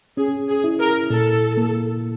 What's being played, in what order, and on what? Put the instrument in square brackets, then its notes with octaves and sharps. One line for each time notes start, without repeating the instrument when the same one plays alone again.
[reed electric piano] C#4 [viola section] G#4
[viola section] G#4
[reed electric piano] E4
[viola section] A#4
[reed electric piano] A#2 [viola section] A4
[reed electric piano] A#3